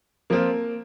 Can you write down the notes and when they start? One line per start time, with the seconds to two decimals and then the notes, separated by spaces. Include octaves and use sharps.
0.30 F3 A#3 C4 F4